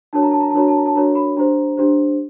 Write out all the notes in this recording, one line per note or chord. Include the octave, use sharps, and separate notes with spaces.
D4 F#4 A#4 C#5 A5
A#5
A5
A#5
A5
D4 F#4 A#4 C#5 A#5
A5
A#5
A5
D4 F#4 A#4 C#5 A#5
B5
D4 G4 C5 A#5
D4 G4 C5